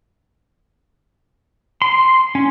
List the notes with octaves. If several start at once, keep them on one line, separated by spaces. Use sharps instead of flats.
C6
C#4